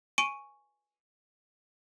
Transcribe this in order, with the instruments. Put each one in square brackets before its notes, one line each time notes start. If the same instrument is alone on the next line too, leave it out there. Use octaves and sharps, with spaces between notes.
[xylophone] G#5 C#6 D7 D#7